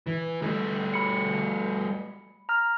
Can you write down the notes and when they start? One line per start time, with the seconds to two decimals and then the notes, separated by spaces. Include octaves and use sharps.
0.07 E3
0.42 G3 A3
0.94 B5 C#7
2.49 A#5 F6